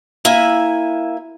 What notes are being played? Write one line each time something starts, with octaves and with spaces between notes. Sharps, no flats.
A#3 E4 E5 G#5